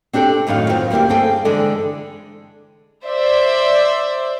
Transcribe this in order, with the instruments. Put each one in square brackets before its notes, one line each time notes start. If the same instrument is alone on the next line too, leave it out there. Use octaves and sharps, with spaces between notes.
[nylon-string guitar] C4 D4 G4 A4 D5
F#2 A2 D#3 F#3 F5
D#3 B3 C4 F4
D2 G3 A#3 E4 G4
G2 C4 G#4 A4 G5
D3 E3 G#3 A4 D5
[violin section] C5 D5 E5